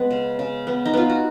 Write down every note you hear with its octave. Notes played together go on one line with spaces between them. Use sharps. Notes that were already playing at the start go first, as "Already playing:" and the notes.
Already playing: G#3 B3 B4
C#3
C#3
B3
D#4
B3 F4
F#4